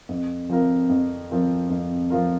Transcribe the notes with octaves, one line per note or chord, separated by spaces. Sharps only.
F2
F3 C4 F4 A#4
F2
F3 C4 F4 A#4
F2
F3 C4 F4 A#4